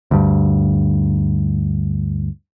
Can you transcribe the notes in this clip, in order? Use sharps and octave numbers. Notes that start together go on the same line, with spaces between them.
D2 G2